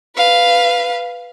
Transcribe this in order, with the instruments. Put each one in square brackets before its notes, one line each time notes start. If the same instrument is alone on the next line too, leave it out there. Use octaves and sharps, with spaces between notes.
[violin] B4 F5